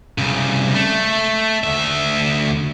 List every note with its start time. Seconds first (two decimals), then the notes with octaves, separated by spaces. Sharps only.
0.18 C2 C#3
0.75 A3
1.64 D2 E5